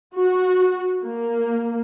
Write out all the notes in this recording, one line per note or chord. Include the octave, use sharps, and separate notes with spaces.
F#4
A#3